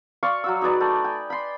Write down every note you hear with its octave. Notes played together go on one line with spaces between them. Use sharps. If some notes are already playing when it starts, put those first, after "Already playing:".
D5 F5 C6 C#6
F#3 F#4 E6
D#4 G#4 B4 D5
A3 G5
G5 G#5
B5 C6